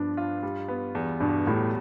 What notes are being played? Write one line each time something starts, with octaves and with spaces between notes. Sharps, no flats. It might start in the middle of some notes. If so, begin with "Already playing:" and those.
Already playing: G2 F3 B3 D4
F4
G3
B3
E2
G2 B2
A2 G3